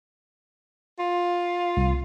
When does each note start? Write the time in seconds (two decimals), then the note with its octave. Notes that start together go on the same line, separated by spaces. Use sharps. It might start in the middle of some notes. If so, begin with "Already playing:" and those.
0.99 F4
1.77 C2